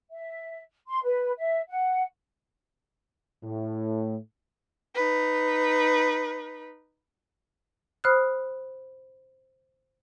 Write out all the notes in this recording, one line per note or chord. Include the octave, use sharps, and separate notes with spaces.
E5
C6
B4
E5
F#5
A2
D#4 B4
C5 B5 D#6 F6 F#6